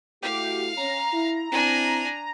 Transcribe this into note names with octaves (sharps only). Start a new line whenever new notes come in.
A3 E4 F#4 G4 F5
C#4 A#5
E4
C4 D4 E4 G#5